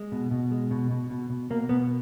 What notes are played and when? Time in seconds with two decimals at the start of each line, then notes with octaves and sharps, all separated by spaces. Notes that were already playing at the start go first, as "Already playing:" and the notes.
Already playing: G#3
0.12 B2
0.31 B2
0.51 G#3
0.71 B2
0.91 B2
1.10 B2
1.30 B2
1.50 B2 A#3
1.69 B2 B3